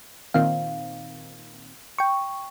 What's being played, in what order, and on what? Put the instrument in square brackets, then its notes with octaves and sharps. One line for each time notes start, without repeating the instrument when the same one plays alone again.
[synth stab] A#2 D#3 C4 [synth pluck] F5
[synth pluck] G5 C#6